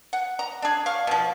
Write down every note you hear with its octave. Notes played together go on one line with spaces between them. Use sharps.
F#5
A#5
D4 G#4
F5 C#6
B2 F3